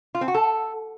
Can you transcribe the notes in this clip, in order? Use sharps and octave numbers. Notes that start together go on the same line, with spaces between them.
F4
C4
F#4
A4